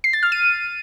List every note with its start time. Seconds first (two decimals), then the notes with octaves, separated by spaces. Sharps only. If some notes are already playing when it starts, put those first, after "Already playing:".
0.04 C7
0.13 A6
0.23 F6
0.32 D#7